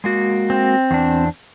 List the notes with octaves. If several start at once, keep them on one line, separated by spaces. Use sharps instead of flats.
G#3 A#3 F#4
C4
E2 D4